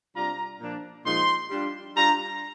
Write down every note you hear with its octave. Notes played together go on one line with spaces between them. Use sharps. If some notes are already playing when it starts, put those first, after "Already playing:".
C3 G3 D4 F4 A#5
A#2 F3 A#3 D4
A#2 F3 G#3 D#4 C6
G3 D4 F4
G3 D4 F4 A#5